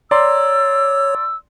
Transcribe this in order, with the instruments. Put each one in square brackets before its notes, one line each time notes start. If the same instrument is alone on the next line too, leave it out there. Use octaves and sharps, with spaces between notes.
[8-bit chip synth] C#5 [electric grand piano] D5 A#5 C6 [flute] E6